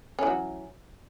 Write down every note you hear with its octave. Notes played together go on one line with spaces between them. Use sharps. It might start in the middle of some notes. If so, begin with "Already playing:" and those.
E3 F#3 C#4